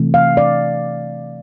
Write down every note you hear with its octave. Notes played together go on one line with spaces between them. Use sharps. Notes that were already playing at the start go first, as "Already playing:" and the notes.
Already playing: C3 E3 A3
F5
D5